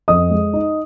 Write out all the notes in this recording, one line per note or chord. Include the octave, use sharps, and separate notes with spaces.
F2 D#5 D#6
G#3
D#4